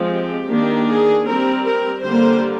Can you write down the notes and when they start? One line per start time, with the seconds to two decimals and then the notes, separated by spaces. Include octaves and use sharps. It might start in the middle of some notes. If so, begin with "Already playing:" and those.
Already playing: F3 G#3 C4
0.09 G4
0.48 D#3 A#3 D4
0.87 G#4
1.26 G3 C4 A#4
1.65 A#4
2.03 D3 G3 A#3 C5